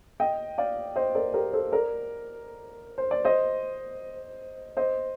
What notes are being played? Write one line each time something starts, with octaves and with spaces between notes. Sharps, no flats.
D#5 G5
D5 F5
C5 D#5
A#4 D5
G4 A#4
A4 C5
A#4 D5
C5
D5
C5 D#5
C5 D#5